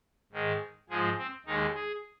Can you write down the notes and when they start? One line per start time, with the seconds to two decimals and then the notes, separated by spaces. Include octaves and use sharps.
0.32 G#2 D#3 G#3
0.89 G#2 F3 G#3 G#4
1.18 C4
1.46 D#2 D#3 G#3 D#4
1.75 G#4